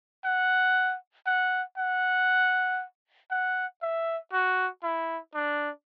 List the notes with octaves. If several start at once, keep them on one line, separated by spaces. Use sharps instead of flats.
F#5
F#5
F#5
F#5
E5
F#4
E4
D4